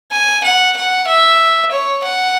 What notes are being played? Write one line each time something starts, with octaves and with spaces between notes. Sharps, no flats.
G#5
F#5
F#5
E5
C#5
F#5